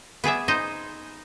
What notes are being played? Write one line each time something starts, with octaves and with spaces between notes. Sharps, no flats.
B3 G#4 D5 E5
D#4 C5 D#5